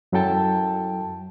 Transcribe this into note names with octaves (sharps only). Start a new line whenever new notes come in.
F#2 F#3 E4 A4 G5 A5